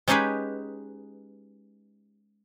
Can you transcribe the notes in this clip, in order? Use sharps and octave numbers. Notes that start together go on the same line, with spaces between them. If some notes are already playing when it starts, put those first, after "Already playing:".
G#3 C#4 D#4 G4 G#4 B4